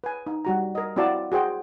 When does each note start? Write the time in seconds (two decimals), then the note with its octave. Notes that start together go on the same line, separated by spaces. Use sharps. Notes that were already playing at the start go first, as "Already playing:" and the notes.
0.04 B4 G#5
0.26 D#4
0.45 G3 F#4 A#5
0.75 A#4 D#5
0.96 C4 E4 F#4 D5 F5 A5
1.32 F#4 G#4 C5 G5